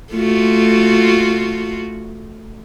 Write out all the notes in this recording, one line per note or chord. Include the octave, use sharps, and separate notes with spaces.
A3 F4 F#4